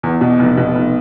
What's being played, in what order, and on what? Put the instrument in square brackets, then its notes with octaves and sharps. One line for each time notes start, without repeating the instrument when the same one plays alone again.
[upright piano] E2
B2
F1
B2
F1